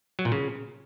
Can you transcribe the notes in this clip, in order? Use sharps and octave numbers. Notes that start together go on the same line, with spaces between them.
F#3
A#2
C#3